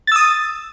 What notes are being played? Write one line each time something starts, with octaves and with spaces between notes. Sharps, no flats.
D#6 E6 A6